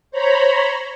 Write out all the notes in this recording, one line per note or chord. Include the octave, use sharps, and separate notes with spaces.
C5 C#5 A#5 B5